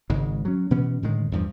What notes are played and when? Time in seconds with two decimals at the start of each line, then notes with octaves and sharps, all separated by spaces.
0.10 G#1 G#2 C#3 G#3
0.45 F#3 C#4
0.71 B2 E3 B3 C#4
1.03 A2 D3 D#3 G#3
1.32 E2 G2 F3